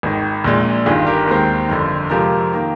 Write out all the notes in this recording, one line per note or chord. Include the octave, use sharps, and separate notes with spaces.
G#1 G#2 D#3
A#1 A#2 G#3
G1 G2 D#3 F4 G#4
G4 A#4
D#2 D#3 G#3 C4
G1 F2 D3
F2 C3 F3 G#3 G4 A#4
D#3 A#3